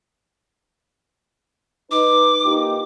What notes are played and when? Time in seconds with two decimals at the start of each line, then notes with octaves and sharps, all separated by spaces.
1.91 D#4 B4 D6
2.45 A#2 D#4 G4